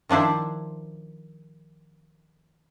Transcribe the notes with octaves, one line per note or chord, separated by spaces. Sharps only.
D#3 F3 D4 E4 C5